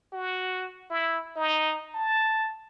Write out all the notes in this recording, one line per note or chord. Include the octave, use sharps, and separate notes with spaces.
F#4
E4
D#4
A5